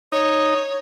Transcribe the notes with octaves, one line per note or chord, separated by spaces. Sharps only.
D#4 C#5